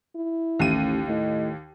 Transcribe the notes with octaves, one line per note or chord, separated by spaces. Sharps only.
E4
A1 D#2 D#7
A2 D#5